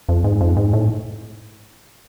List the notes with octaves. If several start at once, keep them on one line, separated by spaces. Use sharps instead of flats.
F2
G#2
F2
G#2
A2